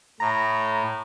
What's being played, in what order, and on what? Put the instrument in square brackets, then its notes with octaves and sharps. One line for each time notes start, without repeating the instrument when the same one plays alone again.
[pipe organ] A2 [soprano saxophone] A#5